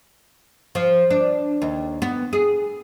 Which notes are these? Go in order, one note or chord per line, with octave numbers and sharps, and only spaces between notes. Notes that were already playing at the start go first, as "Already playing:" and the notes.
F3
D4
D#2
B3
G#4